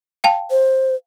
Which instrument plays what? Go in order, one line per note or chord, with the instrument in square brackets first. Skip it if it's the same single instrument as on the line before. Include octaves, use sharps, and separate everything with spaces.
[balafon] F5 G5 A5
[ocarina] C5